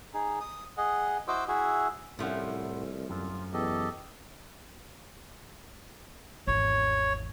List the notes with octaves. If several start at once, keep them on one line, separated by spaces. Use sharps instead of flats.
D#4 G#4
D#6
G#4 D#5 F#5
E4 F#4 C5 D#5 D6 E6
E4 F#4 G#4 E5
C2 A2 F3 A3 C#4 C5 F#5
F#2 F4
E2 G4 A4 D#5
G#1 E2 C#5